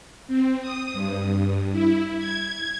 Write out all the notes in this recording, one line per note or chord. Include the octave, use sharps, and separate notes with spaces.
C4
D#6
G2
E4
G#6